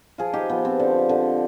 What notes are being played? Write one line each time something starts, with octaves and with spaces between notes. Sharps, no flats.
F3 F4 G#4
D#4 G4
F3 B3
C4
D3
D3